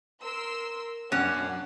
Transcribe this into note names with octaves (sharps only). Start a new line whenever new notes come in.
A#4 C6 E6
F#2 B2 A#3 C#4 D4 F#5